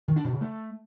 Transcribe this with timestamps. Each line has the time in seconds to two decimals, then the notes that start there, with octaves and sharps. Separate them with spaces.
0.08 D#3
0.16 D4
0.24 B2
0.33 C#3
0.41 A3